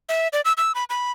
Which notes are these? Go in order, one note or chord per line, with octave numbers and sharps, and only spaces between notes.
E5
D5
E6
E6
B5
B5